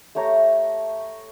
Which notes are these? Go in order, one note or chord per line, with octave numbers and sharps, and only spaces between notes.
A3 G4 C#5 A#5